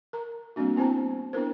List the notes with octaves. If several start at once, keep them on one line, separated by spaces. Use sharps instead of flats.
A#4 A#5
G3 A#3 C4 D4 F#4
B3 C4 E4 C5 A5 A#5
B3 D4 E4 A#4 C5